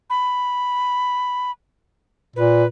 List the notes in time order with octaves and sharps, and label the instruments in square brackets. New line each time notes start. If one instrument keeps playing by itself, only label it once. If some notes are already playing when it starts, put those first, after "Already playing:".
[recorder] B5
[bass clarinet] A#2 [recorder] B4